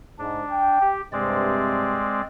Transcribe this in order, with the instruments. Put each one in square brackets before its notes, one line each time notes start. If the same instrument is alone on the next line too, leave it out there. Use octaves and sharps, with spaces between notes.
[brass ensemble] G#2 [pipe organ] D4
[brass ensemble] G5
[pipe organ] G4
[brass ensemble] G2 C3 [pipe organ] G#3 C4 D5